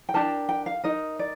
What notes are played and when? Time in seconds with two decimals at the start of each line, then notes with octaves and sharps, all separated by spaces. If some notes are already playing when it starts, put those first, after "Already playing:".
0.09 G5
0.14 D4 G4 A#4 A5
0.49 G5
0.66 F5
0.84 D#4 A#4 D#5
1.19 D5